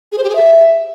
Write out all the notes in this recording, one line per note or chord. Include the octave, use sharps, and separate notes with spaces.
G#4
C5
G4
G#4
E5